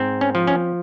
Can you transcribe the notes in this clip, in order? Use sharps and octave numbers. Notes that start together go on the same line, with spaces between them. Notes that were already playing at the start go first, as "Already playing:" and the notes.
Already playing: G#2 C4
C#4
F3
C#4